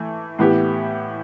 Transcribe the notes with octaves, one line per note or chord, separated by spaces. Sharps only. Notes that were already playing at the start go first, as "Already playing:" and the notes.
Already playing: E3 A3
A2 E3 B3 G4